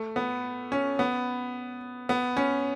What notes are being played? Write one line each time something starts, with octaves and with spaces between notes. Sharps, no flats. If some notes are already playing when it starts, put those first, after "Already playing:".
Already playing: A3
B3
C#4
B3
B3
C#4